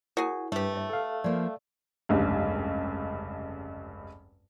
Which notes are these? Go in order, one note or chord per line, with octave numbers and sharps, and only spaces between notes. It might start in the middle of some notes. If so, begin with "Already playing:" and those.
E4 F#4 G#4 A#4 C#5
G2 A3 G4 B4 C#5
C#5 E5
A4 F5
F3 A#3 D5
F1 C#2 G2